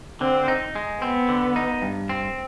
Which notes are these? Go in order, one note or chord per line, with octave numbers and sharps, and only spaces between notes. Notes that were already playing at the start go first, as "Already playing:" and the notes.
D3 C4
D#4
G#3
B3 C4
D3
D#4
G2
C4